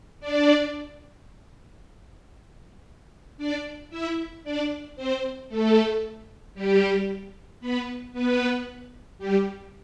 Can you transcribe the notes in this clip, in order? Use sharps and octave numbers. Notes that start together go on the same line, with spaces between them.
D4 D5
D4 D5
E4 E5
D4 D5
C4 C5
A3 A4
G3 G4
B3 B4
B3 B4
G3 G4